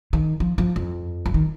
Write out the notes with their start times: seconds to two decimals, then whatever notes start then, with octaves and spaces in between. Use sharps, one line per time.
0.13 D#3
0.40 F3
0.58 F3
0.76 F2
1.26 F3
1.34 D#3